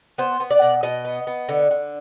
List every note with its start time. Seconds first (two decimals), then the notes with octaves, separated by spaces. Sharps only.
0.18 B3 C5
0.40 B3
0.50 D5
0.62 B2
0.83 B2 D#5
1.05 B3
1.27 B3
1.49 D3
1.71 D3